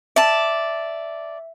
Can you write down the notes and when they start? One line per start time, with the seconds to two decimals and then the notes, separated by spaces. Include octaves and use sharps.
0.16 D5 E5 A5